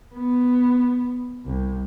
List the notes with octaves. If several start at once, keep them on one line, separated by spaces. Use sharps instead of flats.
B3
C2